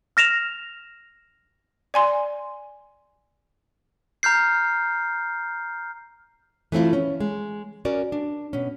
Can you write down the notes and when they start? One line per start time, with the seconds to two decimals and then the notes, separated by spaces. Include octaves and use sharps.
0.17 F6 A#6 E7 F7
1.94 D5 G#5 C6
4.23 A#5 F6 G6 C7
6.72 E3 A3 C4 E4 F4
6.93 C#4
7.20 G#3
7.85 C#4 F#4 A#4 D5
8.12 D4
8.53 B2 C#4